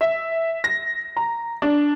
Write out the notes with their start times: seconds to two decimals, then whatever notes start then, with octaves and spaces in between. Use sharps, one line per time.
0.01 E5
0.64 A#6
1.17 A#5
1.62 D4